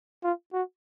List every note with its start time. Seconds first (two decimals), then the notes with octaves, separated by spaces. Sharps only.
0.23 F4
0.53 F#4